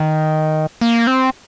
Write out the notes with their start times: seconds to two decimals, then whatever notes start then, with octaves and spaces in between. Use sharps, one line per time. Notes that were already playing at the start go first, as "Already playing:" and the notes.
Already playing: D#3
0.81 A#3
1.07 C4